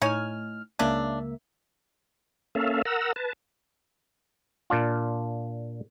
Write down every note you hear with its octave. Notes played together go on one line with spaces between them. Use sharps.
A2 D#4 C#5 G#5 F6
C#2 C#3 A#3 D4 E5
A#3 C#4 A4 E5 F5
A#4 F#5 A#5 E6
B4 A5
A#2 D4 F4